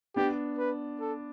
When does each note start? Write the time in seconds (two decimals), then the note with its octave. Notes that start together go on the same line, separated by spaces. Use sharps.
0.16 B3 D4 G4
0.58 B4
1.00 A4